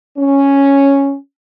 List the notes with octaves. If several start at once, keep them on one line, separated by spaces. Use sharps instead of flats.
C#4